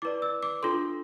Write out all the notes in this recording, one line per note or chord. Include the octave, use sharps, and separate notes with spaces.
E4 B4 D5 D6
E6
D6
D4 F4 A4 C6